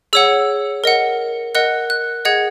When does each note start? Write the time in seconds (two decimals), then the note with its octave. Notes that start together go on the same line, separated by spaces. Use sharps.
0.13 G#4 C#5 F#5 E6
0.84 A#4 D#5 F#5
1.55 A#4 D#5 F#5 F#6
1.90 F#6
2.25 G#4 D#5 F#5 G#6